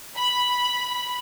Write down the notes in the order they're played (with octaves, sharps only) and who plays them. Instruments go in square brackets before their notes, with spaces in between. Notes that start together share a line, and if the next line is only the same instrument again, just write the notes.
[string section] B5